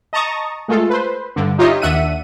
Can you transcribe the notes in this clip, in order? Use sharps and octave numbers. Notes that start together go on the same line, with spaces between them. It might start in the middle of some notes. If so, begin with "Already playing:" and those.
D#5 A5 A#5 C#6 D#6
G#3 A3 F4 A4
B4 C5
G2 D3
D#4 F4 G4 C#5 D#5 E5
D#2 D4 E5 F#5 D#7